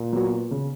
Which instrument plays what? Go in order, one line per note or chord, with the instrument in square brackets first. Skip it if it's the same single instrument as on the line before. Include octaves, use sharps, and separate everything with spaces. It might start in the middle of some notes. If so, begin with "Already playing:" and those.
Already playing: [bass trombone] A#2
[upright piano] F#3 B3 F#4
C#3